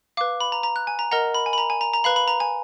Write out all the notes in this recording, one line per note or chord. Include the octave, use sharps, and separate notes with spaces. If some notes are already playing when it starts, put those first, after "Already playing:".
B4 F5 D6
B5
A#5
A#5
F#6
G#5
A#5
A#4 D#5 F#5 A#5
B5
G#5
B5
A#5
G#5
A#5
A#5
B4 F5 B5
B5
A#5
G#5